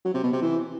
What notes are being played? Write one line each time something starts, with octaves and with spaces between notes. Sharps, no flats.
F#3
C3
B2
C3
E3